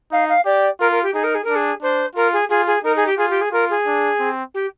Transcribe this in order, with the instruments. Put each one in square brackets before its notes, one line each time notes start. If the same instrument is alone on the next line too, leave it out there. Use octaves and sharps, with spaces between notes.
[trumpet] D#4 [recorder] F5
[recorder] F5
[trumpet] G4 [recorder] D5
[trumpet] F4 [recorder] A#4
[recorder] A#4
G4
[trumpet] D#4 [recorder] G#4
[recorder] A#4
G#4
[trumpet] D4 [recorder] A#4
[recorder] G#4
[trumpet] D4 [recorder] C5
[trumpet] F4 [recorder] A#4
[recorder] G#4
[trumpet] F4 [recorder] G#4
[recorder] G#4
[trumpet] D#4 [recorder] A#4
[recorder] G#4
G4
[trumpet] F4 [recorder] G#4
[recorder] G4
G#4
[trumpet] F4 [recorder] A#4
[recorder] G#4
[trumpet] D4
C4
[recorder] G4